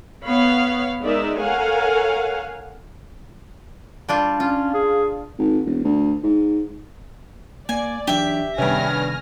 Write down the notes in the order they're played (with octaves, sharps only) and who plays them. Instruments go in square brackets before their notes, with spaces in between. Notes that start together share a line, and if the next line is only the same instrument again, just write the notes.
[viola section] B3 C#5 F5 B5
G#3 D#4 A#4 D5 E5
A4 A#4 C#5 F5 F#5 G#5
[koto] G3 D4 F4
[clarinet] C#4 [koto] F4
[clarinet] G#4
[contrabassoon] G#1
E1
D2
G#2
[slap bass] A#3 [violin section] D5 [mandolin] G#5
[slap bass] E3 F#3 D4 [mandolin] G4 E5
[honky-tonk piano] G2 B3 C#4 [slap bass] C3 D#3 [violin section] G#5 F6 A#6